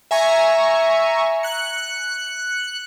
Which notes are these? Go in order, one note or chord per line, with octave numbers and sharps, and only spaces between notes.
E5 G#5 A#5 C#6
F#6 C#7